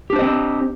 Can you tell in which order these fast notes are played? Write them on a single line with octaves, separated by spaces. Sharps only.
G4 D4 C5 D#5 C4